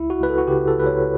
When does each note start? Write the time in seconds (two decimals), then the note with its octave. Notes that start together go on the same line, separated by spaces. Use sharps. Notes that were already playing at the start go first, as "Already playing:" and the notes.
Already playing: C#2 E4
0.10 F#4
0.20 C#2 B4
0.29 A4
0.38 F#4
0.47 C#3 G4
0.68 A4
0.77 C#2 B4
0.86 C#5